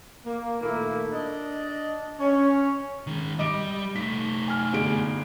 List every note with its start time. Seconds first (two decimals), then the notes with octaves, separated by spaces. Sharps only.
0.25 A#3
0.60 A#2 D#3 A3 A#3 E4
1.12 D4 D#5
2.18 C#4
3.07 D#3 G#3
3.39 G3 D#5 D6 D7
3.96 A3 D#4 B6
4.48 G#5 F6
4.73 G1 G#3 D7